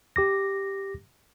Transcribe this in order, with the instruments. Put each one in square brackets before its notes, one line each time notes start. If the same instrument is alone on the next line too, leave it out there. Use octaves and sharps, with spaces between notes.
[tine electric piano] G4 D6 A#6